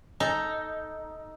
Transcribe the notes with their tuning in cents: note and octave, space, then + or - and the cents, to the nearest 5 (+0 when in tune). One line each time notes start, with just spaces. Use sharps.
D#4 +5 A4 +0